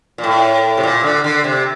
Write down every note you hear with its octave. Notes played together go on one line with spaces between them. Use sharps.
A#2
A2
C3
A#2
D3
D3
C3